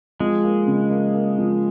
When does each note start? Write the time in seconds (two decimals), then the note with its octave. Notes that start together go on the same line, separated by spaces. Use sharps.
0.20 F3 G#3
0.44 A#3
0.67 C#3
0.91 A#3
1.14 A#3
1.38 F3